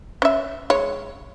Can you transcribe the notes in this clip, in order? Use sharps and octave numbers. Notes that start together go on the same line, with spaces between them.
C#4 E5
G#3 C#5